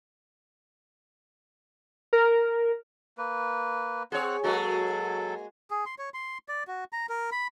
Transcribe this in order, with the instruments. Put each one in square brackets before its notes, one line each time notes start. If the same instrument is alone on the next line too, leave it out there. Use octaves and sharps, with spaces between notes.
[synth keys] A#4
[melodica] A#3 B4
[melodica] C4 F#5 [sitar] G#4 C#5
[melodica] F#3 A4 [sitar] G#3 A#3 F#4
[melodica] G#4
C6
C#5
C6
D5
F#4
A#5
A#4
B5